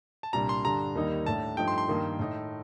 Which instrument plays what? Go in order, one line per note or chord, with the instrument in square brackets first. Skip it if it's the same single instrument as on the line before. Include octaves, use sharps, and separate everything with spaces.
[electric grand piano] A5
[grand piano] C2 A#2 G3 D4 [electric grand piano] A#5
[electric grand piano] C6
[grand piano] G2 D3 G3 D4 [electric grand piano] A#5
[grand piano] D#2 D#3 G3 A#3 D#4
[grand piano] A2 A3 D4 [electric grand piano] A5
[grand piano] G2 F3 A3 D#4 [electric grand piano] G5
[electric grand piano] C6
C6
[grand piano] G2 D#3 A#3 D#4
A2 A3 D#4